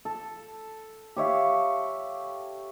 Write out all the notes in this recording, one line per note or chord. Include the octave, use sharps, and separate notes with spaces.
A4
G4 C#5 E5 F5